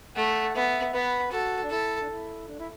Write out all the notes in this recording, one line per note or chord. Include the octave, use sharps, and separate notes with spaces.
A3 F#5
B3 E5
B3 B4
F#4 A4
D4
E4 A4
D4
E4
D4
E4